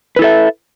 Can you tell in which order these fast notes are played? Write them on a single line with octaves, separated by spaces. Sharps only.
B4 E4 A4 E5